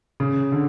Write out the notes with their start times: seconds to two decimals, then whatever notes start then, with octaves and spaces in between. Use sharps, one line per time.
0.20 C#3
0.52 D3